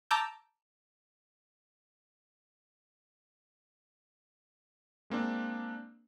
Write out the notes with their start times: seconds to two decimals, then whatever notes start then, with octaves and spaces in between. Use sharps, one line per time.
0.11 A5 A#5 D6 E6 G6
5.10 G#3 A#3 C4 D4